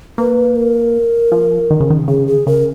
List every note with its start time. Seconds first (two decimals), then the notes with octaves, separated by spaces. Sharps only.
0.18 A#3 B4
0.56 A#4
1.32 F3
1.71 D#3
1.80 C#3
1.90 D#3
2.08 C#3 G#4
2.27 G#4
2.47 C#3 A#4